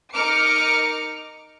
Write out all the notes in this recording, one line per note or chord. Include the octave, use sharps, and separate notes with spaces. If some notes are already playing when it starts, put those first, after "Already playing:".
D#4 A#4 D6 F6 C#7